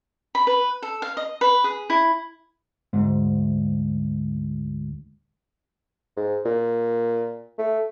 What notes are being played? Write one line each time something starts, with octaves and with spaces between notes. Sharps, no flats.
B5
B4
A4
F5
D#5
B4
G#4
E4
D2 G#2
G#2
A#2
A3